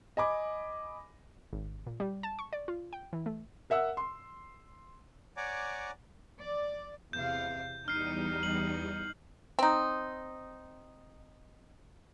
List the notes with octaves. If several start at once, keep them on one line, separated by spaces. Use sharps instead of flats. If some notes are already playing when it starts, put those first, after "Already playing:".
D#5 G#5 B5 D6
G#1
A#2
G3
A5
C#6
D5
F4
G5
E3
A3
A#4 E5 F#5 E6
C6
C#5 D5 F#5 G#5 A#5 D6
D5
E2 C3 F5 G6
E2 G3 D#4 F6 C7
F#7
C4 D#4